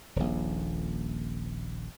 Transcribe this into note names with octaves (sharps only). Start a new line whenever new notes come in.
D#1 A#1